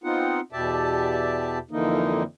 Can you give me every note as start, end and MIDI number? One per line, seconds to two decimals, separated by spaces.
0.04 0.40 59
0.04 0.40 60
0.04 0.40 63
0.04 0.40 65
0.04 0.40 78
0.52 1.58 40
0.52 1.58 47
0.52 1.58 67
0.52 1.58 74
0.52 1.58 76
0.52 1.58 81
1.71 2.23 41
1.71 2.23 50
1.71 2.23 52
1.71 2.23 58
1.71 2.23 63